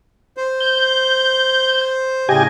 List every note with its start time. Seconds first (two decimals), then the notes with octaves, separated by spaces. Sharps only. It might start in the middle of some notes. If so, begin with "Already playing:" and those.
0.37 C5
0.61 G6
2.29 A2 C#3 G4 D#5 G#5